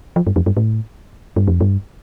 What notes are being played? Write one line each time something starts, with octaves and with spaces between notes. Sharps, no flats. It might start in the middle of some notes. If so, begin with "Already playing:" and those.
F3
G2
F2
G2
A2
G2
F2
G2